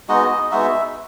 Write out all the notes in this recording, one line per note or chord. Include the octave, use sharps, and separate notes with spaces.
G#3 B3 D#4 F#4 D#5
G#3 B3 D#4 F#4 E5